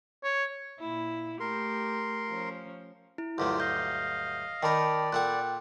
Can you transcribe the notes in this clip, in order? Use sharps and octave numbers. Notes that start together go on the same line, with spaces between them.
C#5
A#2 E4
A3 G4 A#4 C6
F3 C#4
E4
D2 G2 F#3 G#3 F4 G4
D#5 F5 G6
D#3 A#4 D5 G5 A5 B5
A#2 A4 F#5 G5 F#6